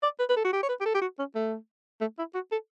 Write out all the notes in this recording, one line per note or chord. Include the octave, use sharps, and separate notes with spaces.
D5
B4
B4
A4
F#4
G4
C#5
B4
G4
A4
G4
F#4
C#4
A3
A3
E4
F#4
A4